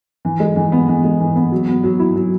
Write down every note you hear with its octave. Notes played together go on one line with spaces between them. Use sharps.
E3
G#3
E3
B3
E3
G#3
E3
B3
F#3
B3
F#3
E4
F#3